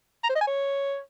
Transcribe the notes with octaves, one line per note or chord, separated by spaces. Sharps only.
A#5
C5
D#5
G#5
C#5